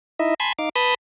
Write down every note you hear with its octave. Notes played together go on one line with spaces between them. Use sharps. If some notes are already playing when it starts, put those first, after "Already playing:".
D#4 E4 D#5 E5
G#5 A5 B5 C6 G#6
D#4 F5 D6
B4 A5 B5 D#6 G6